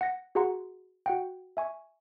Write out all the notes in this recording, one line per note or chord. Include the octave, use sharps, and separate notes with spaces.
F#5 A#6 C#7
F#4 G#4 F5 F#5 A#5 C6
F#4 F#5 G5
E5 G#5 C#6